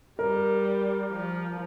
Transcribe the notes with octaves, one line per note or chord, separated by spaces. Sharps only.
G3 A#4
F3